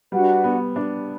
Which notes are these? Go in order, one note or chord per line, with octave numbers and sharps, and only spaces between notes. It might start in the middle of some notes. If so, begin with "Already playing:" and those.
G3 D4 F#4 B4 F#5
B3
D4